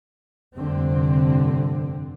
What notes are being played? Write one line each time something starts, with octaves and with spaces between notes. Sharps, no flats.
F1 G2 D3 C4